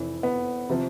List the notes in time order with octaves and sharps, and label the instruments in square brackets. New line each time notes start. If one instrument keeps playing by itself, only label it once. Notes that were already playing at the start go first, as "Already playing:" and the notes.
Already playing: [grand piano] F1 F2 E3
B3
C3 F3